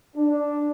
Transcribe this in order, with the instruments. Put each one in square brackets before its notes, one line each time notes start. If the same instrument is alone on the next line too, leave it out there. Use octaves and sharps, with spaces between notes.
[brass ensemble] D4